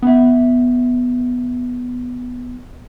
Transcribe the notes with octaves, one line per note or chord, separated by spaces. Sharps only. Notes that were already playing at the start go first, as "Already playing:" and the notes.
B3 E5